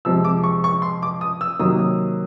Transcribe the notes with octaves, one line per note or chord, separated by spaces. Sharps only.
F2 C3 F3 G#3 C4 E6
D6
C#6
C#6
C6
D6
D#6
E6
C3 D#3 F#3 A#3 D#6
D#6